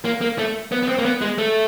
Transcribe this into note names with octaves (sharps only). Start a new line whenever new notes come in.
A#3
A#3
A3
B3
B3
C4
A#3
B3
G#3
A3